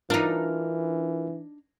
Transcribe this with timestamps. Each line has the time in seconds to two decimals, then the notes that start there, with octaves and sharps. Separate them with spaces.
0.10 E3 D4 D#4 F4 A#4 F6